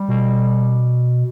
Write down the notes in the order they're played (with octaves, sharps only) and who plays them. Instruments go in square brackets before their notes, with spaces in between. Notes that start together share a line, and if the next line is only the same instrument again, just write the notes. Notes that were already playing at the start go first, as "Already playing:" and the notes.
Already playing: [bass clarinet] G3
[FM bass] B2